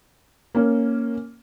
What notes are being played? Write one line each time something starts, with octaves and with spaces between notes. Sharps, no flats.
A#3 C#4